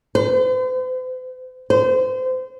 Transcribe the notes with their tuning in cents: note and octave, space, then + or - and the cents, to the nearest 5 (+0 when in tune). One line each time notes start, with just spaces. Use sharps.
C5 -45
C5 -30